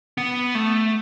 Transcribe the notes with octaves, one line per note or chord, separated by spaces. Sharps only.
B3
A3